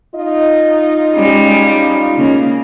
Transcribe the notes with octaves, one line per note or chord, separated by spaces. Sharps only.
D#4 F4 D#5
G3 G#3 C#4
C#3 A#3